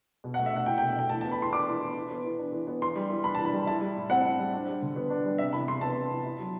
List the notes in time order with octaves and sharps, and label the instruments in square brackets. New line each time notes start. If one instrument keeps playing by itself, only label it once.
[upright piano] B2
F#5
A3
E5
B2 F#5
E4 G5
G5
B2
A3 G5
E3 A5
A5
B3
B5
E3 C6
D4 D6
E3
B3
E3
B3
E3
D4
E3
B3
E3 C6
G3
E3
D4 B5
E3 A5
B5
G3
E4 A5
G3
A2
C4 F#5
E4
G3
D4
G3
D3
B3
D4
G3
C3 E5
E3 B5
C3 C6
B3 A5
C3
E3
E4
F#3